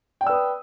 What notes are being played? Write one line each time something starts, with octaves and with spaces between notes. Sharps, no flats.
B4 D5 G5 D#6 E6